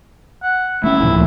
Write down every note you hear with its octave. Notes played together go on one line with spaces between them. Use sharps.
F#5
A3 C#4 E4
D1 A#2 F3